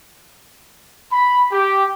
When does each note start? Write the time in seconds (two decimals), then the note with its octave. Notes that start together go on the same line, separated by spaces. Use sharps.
1.12 B5
1.51 G4